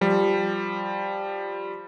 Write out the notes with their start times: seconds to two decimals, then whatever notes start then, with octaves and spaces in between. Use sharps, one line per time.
0.01 F3 G3